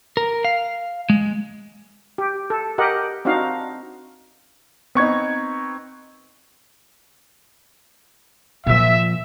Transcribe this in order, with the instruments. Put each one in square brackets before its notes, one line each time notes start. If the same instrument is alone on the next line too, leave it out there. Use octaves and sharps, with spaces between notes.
[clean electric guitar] A#4
F5
G#3
[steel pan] G4
A4
G4 A#4 D#5 F#5
C4 D4 D#4 F#4 F5
[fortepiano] B3 D#4 [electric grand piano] C4 C#6 G#6
[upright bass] A#2 F3 [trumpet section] E5